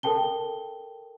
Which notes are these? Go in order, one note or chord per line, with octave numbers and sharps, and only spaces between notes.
A4 A#4 G5 A5 G7